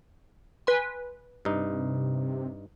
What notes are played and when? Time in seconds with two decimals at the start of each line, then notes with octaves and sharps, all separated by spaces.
0.67 B4 G#5 C6
1.45 G2 C3 D#4